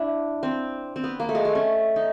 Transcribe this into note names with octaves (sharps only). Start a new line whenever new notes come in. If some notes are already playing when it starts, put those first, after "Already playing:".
Already playing: D4 E4
C4
C4
B3
A#3
A3
G#3
A3
C#4
D#4